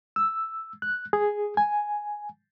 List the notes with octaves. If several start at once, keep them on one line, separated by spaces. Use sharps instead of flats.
E6
F#6
G#4
G#5